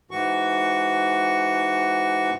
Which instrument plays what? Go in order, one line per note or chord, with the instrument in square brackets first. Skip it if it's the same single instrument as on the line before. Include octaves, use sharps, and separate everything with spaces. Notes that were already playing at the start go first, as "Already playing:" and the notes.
[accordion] G#2 E3 F#4 C#6